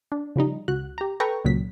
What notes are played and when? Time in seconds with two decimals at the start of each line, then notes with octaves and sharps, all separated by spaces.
0.12 D4
0.36 C#3 F3 G3 D#4
0.68 C#2 F#4 F#6
0.98 G4 A#5
1.20 A4 B4 G5 A#5 C#6
1.45 C#2 A#2 C#3 F#3 B6